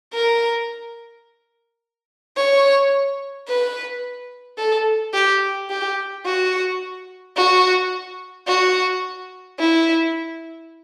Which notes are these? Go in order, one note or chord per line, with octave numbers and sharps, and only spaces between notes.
A#4
C#5
B4
A4
G4
G4
F#4
F#4
F#4
E4